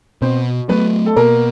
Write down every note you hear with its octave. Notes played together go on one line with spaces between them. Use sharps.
B2 C4 C5
F#3 A3 B3 B4
A4
B2 A#3 A#4